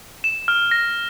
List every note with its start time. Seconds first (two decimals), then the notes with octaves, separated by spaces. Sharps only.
0.24 E7
0.48 F6
0.71 A#6